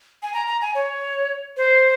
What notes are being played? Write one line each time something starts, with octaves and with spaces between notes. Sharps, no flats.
G#5
A#5
A#5
G#5
C#5
C5